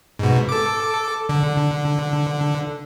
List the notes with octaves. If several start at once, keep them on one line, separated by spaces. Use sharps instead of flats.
G#2 B2
A4 D6
D3